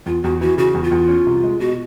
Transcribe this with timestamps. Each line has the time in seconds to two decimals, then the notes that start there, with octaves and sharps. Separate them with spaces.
0.06 E2 F4
0.23 E2 F#4
0.41 E3 F#4
0.57 C#3 F#4
0.74 E2
0.84 F4
0.91 E2
1.08 C#4
1.26 C2
1.44 G#3
1.60 B2 F#4